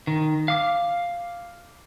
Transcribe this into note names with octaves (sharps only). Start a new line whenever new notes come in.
D#3
F5 D6